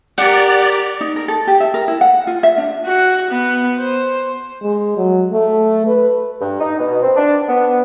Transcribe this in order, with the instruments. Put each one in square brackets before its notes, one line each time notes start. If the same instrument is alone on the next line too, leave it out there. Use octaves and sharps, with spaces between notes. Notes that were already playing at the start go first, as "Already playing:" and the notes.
[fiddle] G4 A#4 [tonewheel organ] D5 [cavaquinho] F#5
[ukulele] D#4
A#4
A4
G4
E5
A#4
E4
F#5
F4
E5
D4
[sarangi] F#4
B3
C5
[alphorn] G#3
F#3
A3
B4
[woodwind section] G2
D#4
B2
C4
D4
B3